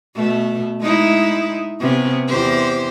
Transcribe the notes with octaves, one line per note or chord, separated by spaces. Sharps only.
B2 A3
G#3 D#4 E4
C3 B3 C#4
E2 G4 C5